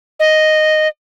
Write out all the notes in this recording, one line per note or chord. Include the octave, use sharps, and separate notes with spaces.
D#5